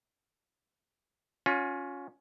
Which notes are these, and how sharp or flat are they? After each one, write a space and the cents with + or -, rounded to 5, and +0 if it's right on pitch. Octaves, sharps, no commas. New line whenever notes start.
C#4 +10 F4 +35